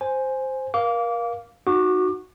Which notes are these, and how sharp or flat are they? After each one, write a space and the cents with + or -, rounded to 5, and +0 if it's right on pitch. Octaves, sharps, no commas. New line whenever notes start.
C5 +0 G#5 +0
A#4 +30 F5 +0 D6 -25
D#4 -5 F#4 -10 D6 +20